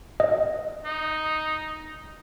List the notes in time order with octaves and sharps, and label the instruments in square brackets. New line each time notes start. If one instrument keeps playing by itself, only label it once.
[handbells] D#5
[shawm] D#4